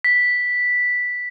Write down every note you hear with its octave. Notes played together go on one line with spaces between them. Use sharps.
B6